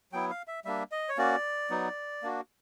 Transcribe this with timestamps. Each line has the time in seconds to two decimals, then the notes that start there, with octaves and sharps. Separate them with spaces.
0.12 F#3 B3 E4 G5
0.30 F5
0.48 E5
0.65 G3 A#3 D4 E5
0.92 D#5
1.09 C#5
1.18 A#3 C#4 F#4 D5
1.70 F#3 B3 D#4
2.23 A#3 D4 F#4